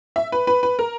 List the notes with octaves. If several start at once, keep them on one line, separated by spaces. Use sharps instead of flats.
E5
B4
B4
B4
A#4